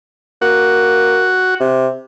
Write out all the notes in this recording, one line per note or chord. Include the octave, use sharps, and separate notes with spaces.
A#3 F#4
C3